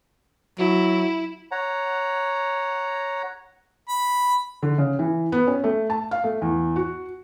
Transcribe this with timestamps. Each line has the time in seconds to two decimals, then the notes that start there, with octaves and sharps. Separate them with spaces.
0.59 F#3 E4
1.51 C#5 F#5 A#5
3.89 B5
4.63 D3
4.78 C#3
4.99 E3
5.32 B3
5.47 C#4
5.64 A3
5.90 A5
6.11 F5
6.24 A3
6.42 E2
6.76 F#4